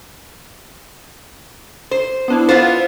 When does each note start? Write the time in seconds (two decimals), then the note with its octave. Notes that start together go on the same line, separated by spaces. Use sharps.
1.91 C5
2.28 B3 D4 E4
2.49 B3 F4 C5 F5